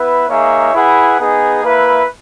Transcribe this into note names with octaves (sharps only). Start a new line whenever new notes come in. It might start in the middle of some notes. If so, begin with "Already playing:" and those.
Already playing: B3 E4 B4 E5
A#3 D#4 G#4 C#5 E5
E4 G#4 B4 F#5
B3 D#4 G#4
A#3 E4 B4 E5